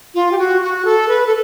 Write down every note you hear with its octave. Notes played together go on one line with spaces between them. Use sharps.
F4
G4
F#4
F#4
A4
B4
A4